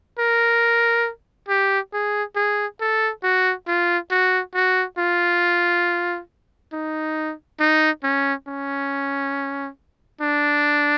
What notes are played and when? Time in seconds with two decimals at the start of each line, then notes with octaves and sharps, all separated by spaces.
0.19 A#4
1.49 G4
1.93 G#4
2.36 G#4
2.80 A4
3.23 F#4
3.67 F4
4.11 F#4
4.55 F#4
4.98 F4
6.73 D#4
7.60 D#4
8.03 C#4
8.47 C#4
10.21 D4